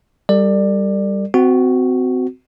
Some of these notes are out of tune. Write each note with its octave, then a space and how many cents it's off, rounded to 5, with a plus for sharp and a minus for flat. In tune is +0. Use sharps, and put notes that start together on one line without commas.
G3 +10 A4 +45 D5 +20
C4 -25 F#4 +0